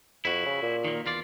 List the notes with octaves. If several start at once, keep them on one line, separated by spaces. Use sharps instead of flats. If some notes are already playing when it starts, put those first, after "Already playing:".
F2 E4 F#4
C#3
A#2
D#3 A#3
E2 F4 D5